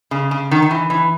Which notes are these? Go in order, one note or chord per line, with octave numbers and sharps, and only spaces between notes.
C#3
C#3
D#3
D#3
E3
E3